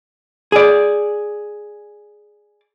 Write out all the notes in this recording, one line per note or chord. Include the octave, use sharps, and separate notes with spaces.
G#4 D5